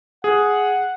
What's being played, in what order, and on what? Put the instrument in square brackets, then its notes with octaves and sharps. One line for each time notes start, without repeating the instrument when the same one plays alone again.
[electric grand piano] G#4 [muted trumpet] F#5